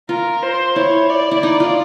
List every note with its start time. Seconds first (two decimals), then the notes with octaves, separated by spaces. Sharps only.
0.09 F4 A#4
0.43 C5
0.76 E4 C#5
1.09 D5
1.31 E4
1.43 D#4
1.60 F4